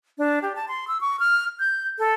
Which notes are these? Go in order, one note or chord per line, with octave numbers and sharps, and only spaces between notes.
D4
G4
A5
C6
E6
C#6
F6
G6
A4